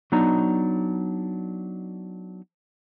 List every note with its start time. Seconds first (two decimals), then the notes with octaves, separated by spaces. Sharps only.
0.12 F#3 B3 D4 D#4 A#5